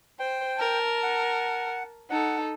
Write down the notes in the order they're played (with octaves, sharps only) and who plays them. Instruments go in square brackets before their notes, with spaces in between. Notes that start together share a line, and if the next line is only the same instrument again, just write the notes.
[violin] C5 [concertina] G5
[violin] A#4 A5
[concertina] F#5
[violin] D#4 A4 [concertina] F#5